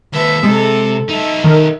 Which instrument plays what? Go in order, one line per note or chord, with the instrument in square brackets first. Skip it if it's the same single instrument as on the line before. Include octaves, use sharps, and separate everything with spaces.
[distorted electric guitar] D#2 A4 [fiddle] B4 E5
[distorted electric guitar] C3 [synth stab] G#3 [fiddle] A4
[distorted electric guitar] D#4 A4 [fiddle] E5
[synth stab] D#3 A#4